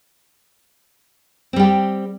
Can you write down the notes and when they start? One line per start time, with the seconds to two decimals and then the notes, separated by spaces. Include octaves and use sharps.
1.53 C4
1.56 G3
1.60 G4